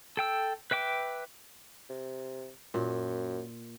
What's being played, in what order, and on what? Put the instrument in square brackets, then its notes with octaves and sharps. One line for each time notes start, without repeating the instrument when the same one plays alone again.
[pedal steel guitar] A4 G5 E6
B4 E5 G5 D6
[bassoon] C3
[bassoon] F#2 [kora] A#2